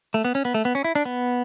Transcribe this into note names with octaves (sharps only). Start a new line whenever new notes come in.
A3
B3
C#4
B3
A3
B3
C#4
E4
D4
B3